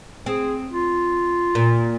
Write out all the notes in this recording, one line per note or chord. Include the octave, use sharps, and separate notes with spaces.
C4 G#4
F4
A#2